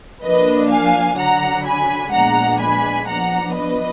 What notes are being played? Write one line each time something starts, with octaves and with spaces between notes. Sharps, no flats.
F3 A#3 D4 B4 D#5
F5 G#5
D3 F#3 D4 F#5 A#5
G#5 B5
A#2 F3 G#3 B3 D4 F#5 A#5
G#5 B5
F3 B3 D4 F#5 A#5
B4 D#5